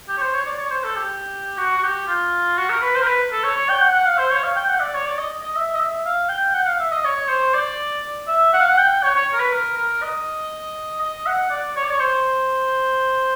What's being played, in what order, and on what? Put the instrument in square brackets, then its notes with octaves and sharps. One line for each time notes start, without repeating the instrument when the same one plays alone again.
[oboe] G4
C#5
C5
C#5
D5
C#5
C5
A4
G4
F#4
F#4
G4
F4
F#4
A#4
B4
C5
A#4
B4
A4
C#5
C#5
G5
F#5
F#5
F5
C5
C#5
F5
G5
F#5
D5
C#5
D5
D#5
D#5
E5
D#5
E5
F5
G5
F#5
F5
E5
D#5
C#5
C5
D5
E5
F#5
F5
F#5
G5
C#5
C#5
A#4
B4
A#4
A#4
D#5
D#5
F#5
D5
C#5
D5
C#5
C5